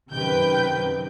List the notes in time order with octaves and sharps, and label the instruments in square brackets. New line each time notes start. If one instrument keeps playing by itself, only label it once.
[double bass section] F#2 C3 D#3 [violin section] B4 G5 G6